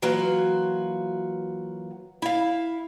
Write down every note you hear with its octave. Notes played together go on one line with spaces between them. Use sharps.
E3 F#3 A#3 F4 F#4
E4 F5